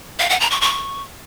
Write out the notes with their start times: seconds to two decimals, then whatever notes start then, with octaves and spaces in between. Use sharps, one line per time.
0.19 F5
0.30 F#5
0.40 A#5
0.51 C#6
0.61 C#6